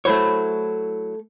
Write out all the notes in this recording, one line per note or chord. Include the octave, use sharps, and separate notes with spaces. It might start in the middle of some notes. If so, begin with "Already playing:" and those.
F#3 A3 E4 C5 C#5